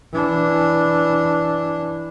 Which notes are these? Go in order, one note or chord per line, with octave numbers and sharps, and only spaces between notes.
E3 D4